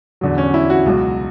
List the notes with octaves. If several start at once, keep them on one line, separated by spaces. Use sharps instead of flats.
E2 D3 F#3
C#4
E4
F#4
C#2 B2 F#3